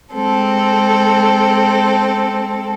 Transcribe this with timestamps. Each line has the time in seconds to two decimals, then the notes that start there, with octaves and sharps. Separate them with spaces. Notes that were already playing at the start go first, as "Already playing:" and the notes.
0.13 G#3 C4 A4